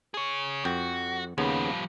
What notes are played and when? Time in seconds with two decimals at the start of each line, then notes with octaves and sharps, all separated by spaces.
0.14 G#4 C#5
0.65 F2 F#4 G5
1.38 D#2 C#3 F3 G3 B3